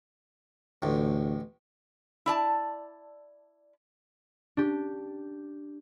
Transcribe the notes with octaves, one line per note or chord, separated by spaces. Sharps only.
A1 D2 A2
E4 D5 A5
D4 G4